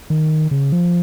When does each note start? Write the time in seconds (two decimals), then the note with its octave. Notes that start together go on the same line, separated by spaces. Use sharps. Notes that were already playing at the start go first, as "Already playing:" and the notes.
0.10 D#3
0.51 C#3
0.72 F3